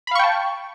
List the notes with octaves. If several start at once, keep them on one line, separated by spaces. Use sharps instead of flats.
F5 G5 A5 B5 C#6